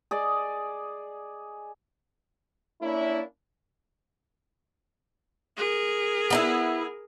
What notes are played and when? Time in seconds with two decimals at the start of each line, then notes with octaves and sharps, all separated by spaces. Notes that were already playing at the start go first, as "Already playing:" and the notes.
0.11 G#4 D5 D#5
2.81 A#3 C#4 D4 E4
5.57 G#4 A#4
6.30 B3 D#4 E4